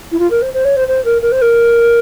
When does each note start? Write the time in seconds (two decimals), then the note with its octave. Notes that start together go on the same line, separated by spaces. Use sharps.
0.12 E4
0.19 F4
0.30 A#4
0.42 C5
0.54 C5
0.65 C#5
0.76 C5
0.88 C5
1.05 A#4
1.22 A#4
1.32 C5
1.42 A#4